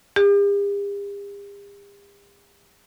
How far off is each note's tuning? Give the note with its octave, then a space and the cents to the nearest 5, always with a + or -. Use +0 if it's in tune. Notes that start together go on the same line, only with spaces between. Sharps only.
G4 +45